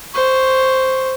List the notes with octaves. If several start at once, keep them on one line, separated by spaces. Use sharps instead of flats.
C5 C#6